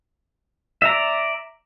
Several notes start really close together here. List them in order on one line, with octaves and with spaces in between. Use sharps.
E5 A#5 D5